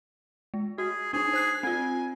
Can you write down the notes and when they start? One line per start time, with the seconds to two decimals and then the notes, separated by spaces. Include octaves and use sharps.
0.54 G#3
0.78 F#4 G#4
1.13 D4 D#4 G#4
1.33 C5 F#6 C7
1.63 C4 F4 G#5